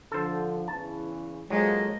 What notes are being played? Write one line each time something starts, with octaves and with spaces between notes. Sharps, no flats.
D3 F3 A4 C5
E2 C#3 E3 A5
F#3 G#3 A#3 F4 A4 C5 D#5